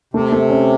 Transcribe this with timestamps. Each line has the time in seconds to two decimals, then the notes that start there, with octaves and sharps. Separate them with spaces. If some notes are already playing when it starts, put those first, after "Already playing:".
0.14 C3 A3
0.32 A3
0.50 C#4